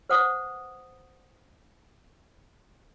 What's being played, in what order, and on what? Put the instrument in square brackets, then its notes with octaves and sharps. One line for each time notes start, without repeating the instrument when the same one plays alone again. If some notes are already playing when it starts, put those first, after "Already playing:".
[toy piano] B4 C5 F#5 D#6